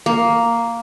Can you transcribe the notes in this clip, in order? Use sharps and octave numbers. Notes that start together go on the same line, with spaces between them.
A#3